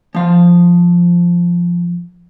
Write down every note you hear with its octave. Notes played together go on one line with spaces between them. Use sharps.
F3 F5